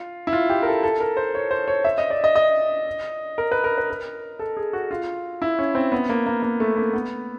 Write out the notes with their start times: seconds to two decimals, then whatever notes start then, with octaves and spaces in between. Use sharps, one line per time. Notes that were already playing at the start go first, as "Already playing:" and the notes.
Already playing: F4
0.27 E4
0.33 F4
0.50 G4
0.63 A#4
0.67 A4
0.83 A4
1.00 A#4
1.17 C5
1.35 C#5
1.51 C5
1.68 C#5
1.85 E5
1.98 D#5
2.10 D5
2.24 D#5
2.36 D#5
3.38 A#4
3.52 B4
3.64 A#4
3.78 B4
3.90 A#4
4.39 A4
4.57 G#4
4.73 F#4
4.91 F4
5.42 E4
5.59 C#4
5.75 C4
5.92 B3
6.09 A#3
6.26 A#3
6.43 A#3
6.60 A3
6.76 A#3
6.93 B3